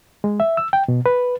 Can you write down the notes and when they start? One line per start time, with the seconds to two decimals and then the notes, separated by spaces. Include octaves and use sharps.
0.24 G#3
0.40 E5
0.57 E6
0.73 G5
0.88 B2
1.06 B4